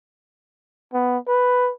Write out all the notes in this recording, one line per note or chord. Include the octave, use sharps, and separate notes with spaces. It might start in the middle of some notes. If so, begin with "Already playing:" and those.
B3
B4